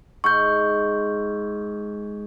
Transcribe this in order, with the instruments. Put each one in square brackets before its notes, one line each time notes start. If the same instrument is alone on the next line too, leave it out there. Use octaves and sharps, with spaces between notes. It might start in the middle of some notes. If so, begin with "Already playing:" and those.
[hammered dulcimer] G#2 [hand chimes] C#6 G6